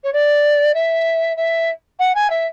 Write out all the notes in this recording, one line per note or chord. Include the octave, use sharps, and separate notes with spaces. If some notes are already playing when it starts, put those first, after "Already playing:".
C#5
D5
E5
E5
F#5
G#5
E5